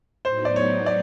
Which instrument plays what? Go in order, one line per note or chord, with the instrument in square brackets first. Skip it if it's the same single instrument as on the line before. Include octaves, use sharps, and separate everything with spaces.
[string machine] A2 F#3 B3 D#4 [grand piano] C5
[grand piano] D5
C#5
D5